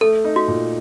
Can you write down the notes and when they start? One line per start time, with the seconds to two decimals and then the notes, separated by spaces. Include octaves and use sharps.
0.01 A3 A4
0.25 D#4
0.36 F#4
0.48 A#2